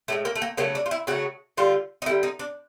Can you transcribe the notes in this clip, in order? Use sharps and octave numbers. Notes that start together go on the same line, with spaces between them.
A2 F3 G#3 A3
A#3
A3
A#3
C#3 F#3 A3 A#3
D4
F4
E4
C#3 F#3 A3 F#4
D3 G3 F4
D#4
D3 G3 E4
D#4
D4